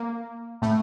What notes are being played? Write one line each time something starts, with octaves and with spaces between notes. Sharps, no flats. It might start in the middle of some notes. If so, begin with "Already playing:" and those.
Already playing: A#3
A2 A3